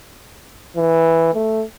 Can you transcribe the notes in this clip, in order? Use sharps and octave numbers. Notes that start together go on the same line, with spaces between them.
E3
A3